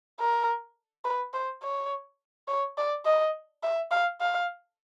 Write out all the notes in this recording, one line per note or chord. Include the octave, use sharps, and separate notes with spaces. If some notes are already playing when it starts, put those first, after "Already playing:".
A#4
B4
C5
C#5
C#5
D5
D#5
E5
F5
F5